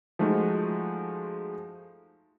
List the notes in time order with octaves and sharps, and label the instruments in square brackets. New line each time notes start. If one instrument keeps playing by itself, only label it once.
[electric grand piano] F3 G#3 A3 D#4 F4 F#4